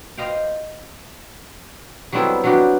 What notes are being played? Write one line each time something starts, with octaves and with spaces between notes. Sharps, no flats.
C5 D#5 F5 G5
F#3 G3 B3 C4 E4 A4
F#3 B3 D4 F#4 G4